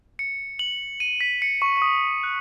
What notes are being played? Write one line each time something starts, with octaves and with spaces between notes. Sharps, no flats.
C#7
F#7
D#7
B6
C#7
C#6
C#6
D#6
F#6